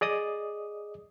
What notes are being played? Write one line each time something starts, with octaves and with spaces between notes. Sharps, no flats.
G#4 D5 D#5 D#6